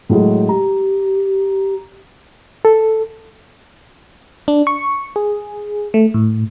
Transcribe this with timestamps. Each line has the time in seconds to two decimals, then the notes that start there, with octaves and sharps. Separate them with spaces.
0.09 A2 F#3 G#3
0.49 G4 A#5
2.65 A4
4.48 D4
4.67 C#6
5.16 G#4
5.94 A3
6.14 A2